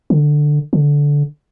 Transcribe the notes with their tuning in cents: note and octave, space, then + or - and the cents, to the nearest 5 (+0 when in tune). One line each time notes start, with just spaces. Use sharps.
D3 +10
D3 -15